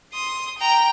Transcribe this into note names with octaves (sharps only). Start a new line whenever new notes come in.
C6 D#6
G5 A#5